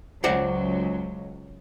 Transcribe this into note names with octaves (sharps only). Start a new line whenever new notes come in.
C#2 F#3 C5 D5 F#5